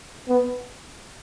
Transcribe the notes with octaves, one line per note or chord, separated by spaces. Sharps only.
B3